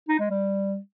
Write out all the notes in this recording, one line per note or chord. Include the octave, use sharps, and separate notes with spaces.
D#4
G#3
G3